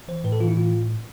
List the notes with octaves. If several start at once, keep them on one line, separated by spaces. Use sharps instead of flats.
E3 C5
A2 B4
A4
E3 F4
E4
A2 F4